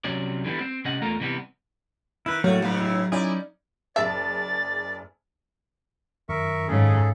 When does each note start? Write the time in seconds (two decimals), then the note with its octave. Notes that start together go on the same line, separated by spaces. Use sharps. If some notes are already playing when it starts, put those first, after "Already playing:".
0.04 C2 C3 F#3 C#4 D5
0.45 D3 E3 G3 B3
0.60 C4
0.85 C3 G3 C#4 D#5 F#5
1.02 E2 A3 A#3 F4 A#4
1.20 C3 E3 G3 B3
2.26 D#3 E4 B4
2.44 A2 F#3 A3 A#3 F#4 C#5
2.62 G2 C#3 F#3 F5 B5
2.81 E4
3.12 C#4 D#4 E4 G#4 D5 D6
3.96 F#1 G#4 D5 E5 A5 A6
6.29 F#2 D#3 A#4 E5 C#6
6.68 G#2 C#3 G#4 A4